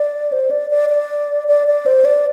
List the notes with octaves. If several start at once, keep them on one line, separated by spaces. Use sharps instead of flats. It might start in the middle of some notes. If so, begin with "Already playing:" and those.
Already playing: D5
C5
D5
D5
D5
D5
D5
C5
D5